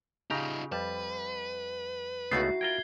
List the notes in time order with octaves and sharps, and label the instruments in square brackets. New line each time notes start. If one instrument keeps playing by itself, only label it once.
[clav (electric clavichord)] C#3 G4 A#5 [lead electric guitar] D#4 F4
[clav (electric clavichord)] F2 G3 A5 [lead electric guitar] B4
[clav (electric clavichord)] C#2 A3 B3 [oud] D#4 E4 F#4 [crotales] C7
[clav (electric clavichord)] F4 A#4 G5 [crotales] G#6 G7